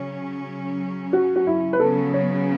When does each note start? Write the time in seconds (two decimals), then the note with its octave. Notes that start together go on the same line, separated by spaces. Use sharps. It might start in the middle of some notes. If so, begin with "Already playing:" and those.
Already playing: C#3 F#3 C#4 C#5
1.13 F#4
1.36 F#4
1.47 E4
1.73 B4
1.80 C#3 F#3 B3 A4
2.14 C#5